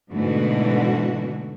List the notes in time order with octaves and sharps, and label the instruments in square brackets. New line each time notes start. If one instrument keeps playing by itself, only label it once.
[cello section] G#2 B2 D3 E3 A3 F#4